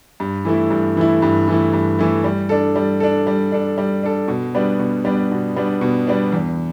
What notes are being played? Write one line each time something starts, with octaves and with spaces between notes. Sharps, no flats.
G2
E3 A3 E4
G2
E3 A3 E4
G2
E3 A3 E4
G2
E3 A3 E4
G3
D4 A4
G3
D4 A4
G3
D4 A4
G3
D4 A4
B2
G3 B3 D4
B2
G3 B3 D4
B2
G3 B3 D4
B2
G3 B3 D4
E2